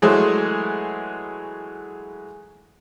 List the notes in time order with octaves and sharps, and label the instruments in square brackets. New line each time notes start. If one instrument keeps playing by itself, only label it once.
[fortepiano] E3 F#3 G#3 A3 G#4 C5